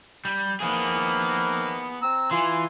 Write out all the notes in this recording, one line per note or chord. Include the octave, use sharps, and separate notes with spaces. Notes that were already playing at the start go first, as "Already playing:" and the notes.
G3
D#3 F3 A#3 B3 G#4
C4 A#5 E6
E3 F4 G#5 C6